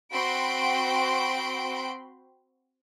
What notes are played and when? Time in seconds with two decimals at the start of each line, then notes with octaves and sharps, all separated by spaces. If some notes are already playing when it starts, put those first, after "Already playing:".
0.12 C4 F#4 G5 B5 C6 D7